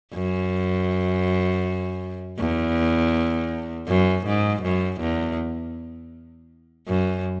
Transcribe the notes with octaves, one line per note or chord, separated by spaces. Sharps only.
F#2
E2
F#2
G#2
F#2
E2
F#2